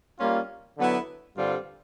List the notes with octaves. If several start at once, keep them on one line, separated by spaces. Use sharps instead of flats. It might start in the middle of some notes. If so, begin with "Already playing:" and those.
G3 A#3 C#4 F4
D3 F#3 B3 E4
G2 D3 G3 C4 F4